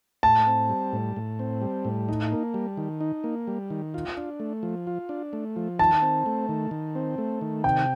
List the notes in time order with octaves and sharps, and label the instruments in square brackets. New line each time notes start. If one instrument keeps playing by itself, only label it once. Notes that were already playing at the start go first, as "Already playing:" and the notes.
[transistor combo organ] A2 [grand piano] A5
[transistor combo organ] C4
G3
A2
A2
C4
G3
A2
D#4
A#3
G3
D#3
D#4
A#3
G3
D#3
F4
D4
A3
F3
F4
D4
A3
F3
[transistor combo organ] D#3 [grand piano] A5
[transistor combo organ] C4
A3
D#3
D#3
C4
A3
D#3
[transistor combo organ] C3 [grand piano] G5